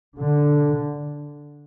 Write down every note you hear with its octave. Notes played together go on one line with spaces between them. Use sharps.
D3